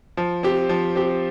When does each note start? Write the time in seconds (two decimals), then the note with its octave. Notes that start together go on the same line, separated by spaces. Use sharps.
0.17 F3
0.43 C4 G4
0.69 F3
0.96 C4 G4